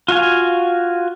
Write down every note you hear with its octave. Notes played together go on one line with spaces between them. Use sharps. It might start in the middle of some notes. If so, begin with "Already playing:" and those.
F4 F#4 F5 G#5